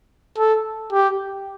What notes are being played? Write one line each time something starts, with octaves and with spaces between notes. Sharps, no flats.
A4
G4